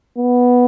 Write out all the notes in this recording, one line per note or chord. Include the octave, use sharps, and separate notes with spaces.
B3